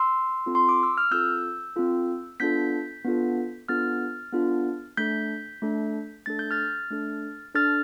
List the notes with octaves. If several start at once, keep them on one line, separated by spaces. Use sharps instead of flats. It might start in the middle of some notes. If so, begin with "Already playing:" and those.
Already playing: C6 E6
C4 F4 A4
C6
D6
E6
F6
C4 F4 A4 E6 G6
C4 F4 A4
B3 D4 F4 A4 G6 B6
B3 D4 F4 A4
B3 D4 F4 A4 F6 A6
B3 D4 F4 A4
A3 D4 A4 G6 B6
A3 D4 A4
A3 D4 A4 A6
G6
F6 A6
A3 D4 A4
D4 A4 F6 A6